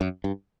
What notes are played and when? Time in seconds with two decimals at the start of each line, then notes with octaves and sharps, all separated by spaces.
0.01 F#2
0.24 G2